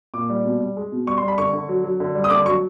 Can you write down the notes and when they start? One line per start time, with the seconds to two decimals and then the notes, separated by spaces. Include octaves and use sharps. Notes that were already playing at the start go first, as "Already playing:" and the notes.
0.14 A#2 D6
0.29 G3
0.45 B2
0.60 G3
0.77 G#3
0.92 B2
1.07 G3 C#6
1.18 C6
1.23 G3
1.28 B5
1.38 D3 C#6
1.53 D3
1.69 F#3
1.84 F#3
2.00 D3
2.15 G3
2.24 D#6
2.30 D3 D6
2.46 F#3 C#6